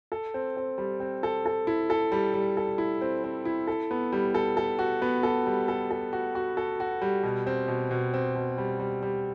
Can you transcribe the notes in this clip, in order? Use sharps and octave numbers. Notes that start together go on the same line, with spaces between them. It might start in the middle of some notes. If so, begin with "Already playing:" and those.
A4
C4
C4
G3
C4
A4
A4
E4
A4
G3
G3
A4
E4
C4
C4
E4
A4
B3
G3
A4
A4
F#4
B3
A4
G3
A4
A4
F#4
F#4
A4
F#4
G3
B2
C4
B2
B2
C4
B2
G3
G3
G3